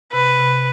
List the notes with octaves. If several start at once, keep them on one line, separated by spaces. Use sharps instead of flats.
C3 B4
C3